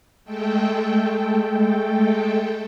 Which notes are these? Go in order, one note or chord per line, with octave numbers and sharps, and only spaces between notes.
G#3 A3 A4 G5